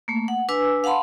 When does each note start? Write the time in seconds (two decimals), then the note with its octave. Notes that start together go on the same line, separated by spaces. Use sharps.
0.08 A3 A#3
0.28 F#5
0.49 D4 B4 G#5 D6 E6
0.84 F5 F#5 A5 B5 C6